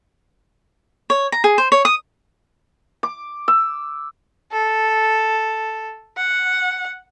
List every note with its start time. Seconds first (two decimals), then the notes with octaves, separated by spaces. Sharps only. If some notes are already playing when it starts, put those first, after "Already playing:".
1.10 C#5
1.32 A#5
1.44 G#4
1.58 C5
1.72 C#5
1.85 D#6
3.03 D6
3.48 E6
4.52 A4
6.18 F#5